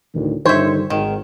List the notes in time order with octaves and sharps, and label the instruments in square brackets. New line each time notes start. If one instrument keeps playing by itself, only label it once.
[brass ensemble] D2 A2 D#3
[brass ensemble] G2 D3 D#3 [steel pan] C5 [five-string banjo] C#5 E5
[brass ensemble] G#1 [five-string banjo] D#3